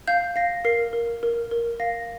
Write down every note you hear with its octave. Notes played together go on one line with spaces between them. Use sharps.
F5 G6
F5 A#6
A#4 C7
A#4
A#4
A#4
F5 A#6